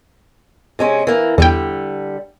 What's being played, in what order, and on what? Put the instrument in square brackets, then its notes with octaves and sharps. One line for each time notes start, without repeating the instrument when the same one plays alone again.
[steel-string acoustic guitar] C3 G#3 C#4
E3 A#3
[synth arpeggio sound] E2 G5 [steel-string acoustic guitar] D3 G3